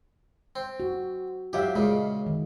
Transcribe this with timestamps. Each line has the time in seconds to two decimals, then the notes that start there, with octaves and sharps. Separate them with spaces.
0.56 C4
0.80 F#4
1.53 F#3 F4 G4 E5 F5
1.76 A#2 C#3 G#3
2.26 D#3